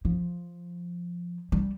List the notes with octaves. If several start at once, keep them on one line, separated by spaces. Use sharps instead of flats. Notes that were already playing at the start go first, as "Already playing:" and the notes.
F3
G3